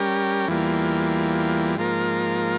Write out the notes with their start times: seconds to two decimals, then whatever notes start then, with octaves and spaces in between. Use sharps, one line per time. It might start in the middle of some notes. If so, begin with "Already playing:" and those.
Already playing: G3 C#4 G4 A#4
0.48 E2 E3 G3 A#3 F4
1.77 G#2 F3 A#3 F4 A#4